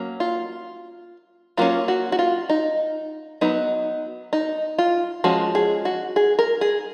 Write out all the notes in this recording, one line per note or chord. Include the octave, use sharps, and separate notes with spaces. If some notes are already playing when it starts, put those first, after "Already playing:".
Already playing: F#3 A#3 C#4
F4
F#3 A#3 C#4 F4
F#4
F#4
F4
D#4
F#3 B3 D#4
D#4
F4
F3 G#3 C#4 F#4
G#4
F#4
G#4
A#4
G#4